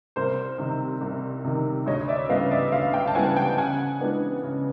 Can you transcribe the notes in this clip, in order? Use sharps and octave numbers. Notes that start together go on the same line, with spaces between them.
C2 A#4 C5
C3 D#3
C2
C3 D#3
D2 C#5 D#5
D5 E5
C#3 E3 G3 B3 D#5 F5
D5 E5
D2 D#5 F5
F5 G5
A5
C#3 E3 G3 B3 F#5 G#5
G5 A5
C#3 F#5 G#5
E3 G#3 B3 D4
C#3